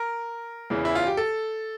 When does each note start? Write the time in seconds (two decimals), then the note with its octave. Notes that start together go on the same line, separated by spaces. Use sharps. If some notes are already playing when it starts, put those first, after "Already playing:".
Already playing: A#4
0.70 E2 C#3 E3
0.85 E4
0.95 F4
1.07 G4
1.17 A4